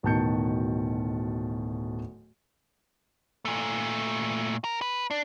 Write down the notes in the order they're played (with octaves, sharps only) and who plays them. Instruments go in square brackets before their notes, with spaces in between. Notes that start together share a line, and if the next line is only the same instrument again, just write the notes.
[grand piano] D1 B2 D#3 A5 G6 C#7
[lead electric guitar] A#2 A3
A#4
B4
D4